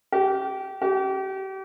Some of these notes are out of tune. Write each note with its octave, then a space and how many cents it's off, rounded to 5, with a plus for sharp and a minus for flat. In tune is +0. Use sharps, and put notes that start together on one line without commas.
G4 -25
G4 -35